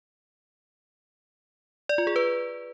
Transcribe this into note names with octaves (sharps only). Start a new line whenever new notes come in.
D5
F4
G#4
B4